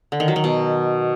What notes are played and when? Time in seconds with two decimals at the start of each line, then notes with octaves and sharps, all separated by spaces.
0.12 D3
0.20 D#3
0.28 F#3
0.36 D#3
0.44 B2